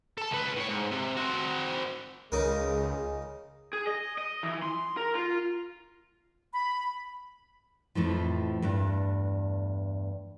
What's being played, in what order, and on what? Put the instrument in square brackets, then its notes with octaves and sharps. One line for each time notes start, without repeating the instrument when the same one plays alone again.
[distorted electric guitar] A4 A5
C#2 B4
A2 C#5
G#2
C3
C4 F#4
[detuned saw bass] C#2 [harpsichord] C#3 D#4 A#4 [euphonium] G#3
[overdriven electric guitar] G#4
D#5
D#5
E3
C6
A#4
F4
[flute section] B5
[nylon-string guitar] F2 A2 E3 F3
E2 G2 A3 D4